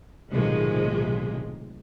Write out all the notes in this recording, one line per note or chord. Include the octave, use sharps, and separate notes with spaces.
B1 A2 C3 D#3 F3 G#3